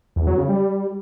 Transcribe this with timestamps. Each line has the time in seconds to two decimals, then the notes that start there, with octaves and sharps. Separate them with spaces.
0.16 E2
0.27 F#3
0.38 C#3
0.49 G3